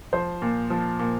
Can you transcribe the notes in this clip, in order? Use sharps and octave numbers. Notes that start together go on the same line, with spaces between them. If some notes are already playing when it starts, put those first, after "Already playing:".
F3 C5
A#2
F3
A#2